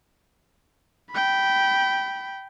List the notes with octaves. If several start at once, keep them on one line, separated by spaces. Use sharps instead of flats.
G5 B5